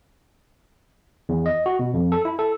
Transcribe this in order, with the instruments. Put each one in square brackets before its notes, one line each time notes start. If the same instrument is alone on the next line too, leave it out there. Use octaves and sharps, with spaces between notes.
[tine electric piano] E2
D#5
F#4
B2
F2
A4
E4
A4